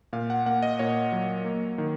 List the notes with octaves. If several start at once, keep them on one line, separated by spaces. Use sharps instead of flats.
A#2 F5
F#5
A#3 F#5
D#5
A#2 C#5
F#3
A#3
D#3